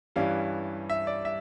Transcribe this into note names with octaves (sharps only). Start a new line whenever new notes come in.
G2 E3 G3 C#4 F5
E5
D5
E5